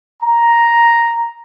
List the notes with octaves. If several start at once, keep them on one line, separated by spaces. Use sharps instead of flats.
A#5